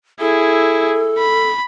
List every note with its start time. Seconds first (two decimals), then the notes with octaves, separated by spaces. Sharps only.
0.20 E4 G#4 A4
1.18 B5